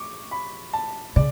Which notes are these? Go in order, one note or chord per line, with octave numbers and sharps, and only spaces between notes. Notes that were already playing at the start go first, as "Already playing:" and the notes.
Already playing: C#6 D6
B5
A5
C#3 D5